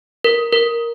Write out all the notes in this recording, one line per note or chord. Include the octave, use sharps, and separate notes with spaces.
A#4
A#4